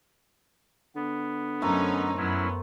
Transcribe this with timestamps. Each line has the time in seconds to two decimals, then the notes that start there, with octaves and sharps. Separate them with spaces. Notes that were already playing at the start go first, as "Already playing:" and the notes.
0.96 D3 B3
1.62 F#2 A3 C#4 D#4 A#4 C5
2.17 F#2 F#3 B3 C#4 E4